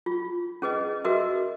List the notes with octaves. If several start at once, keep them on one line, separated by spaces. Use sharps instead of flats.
F4
C#4 G#4 B4 D#5
F#4 A#4 B4 D#5 E5